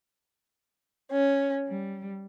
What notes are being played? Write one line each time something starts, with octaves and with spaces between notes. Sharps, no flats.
C#4
G3